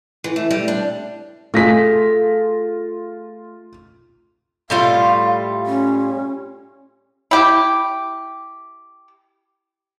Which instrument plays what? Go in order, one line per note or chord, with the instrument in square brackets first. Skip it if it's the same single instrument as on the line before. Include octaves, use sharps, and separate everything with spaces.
[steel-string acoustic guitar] E3
A3
G3
D4
[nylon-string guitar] A3 G#4 [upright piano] F4 A#6 B6
[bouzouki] A2 G3 F4 [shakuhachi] F5
[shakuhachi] C#4
[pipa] E4 G4